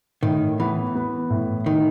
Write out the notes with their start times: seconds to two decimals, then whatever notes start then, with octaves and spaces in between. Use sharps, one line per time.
0.23 A2 D#3
0.60 E3 B3
0.95 B3
1.30 A2
1.66 D#3 D#4